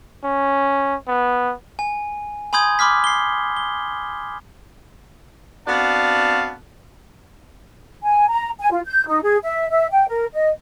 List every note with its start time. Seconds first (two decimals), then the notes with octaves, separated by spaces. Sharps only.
0.24 C#4
1.08 B3
1.79 G#5
2.53 G#5 B5 C6 D#6 G6 G#6
2.79 B5 C6 D6 F6 B6
3.04 C7 G7
3.56 G7
5.67 B3 C4 D4 F#4 F5 A5
8.03 G#5
8.29 A#5
8.59 G#5
8.71 F4
8.86 G6
9.07 D#4
9.23 G#4
9.43 E5
9.70 E5
9.91 G5
10.08 A#4
10.34 D#5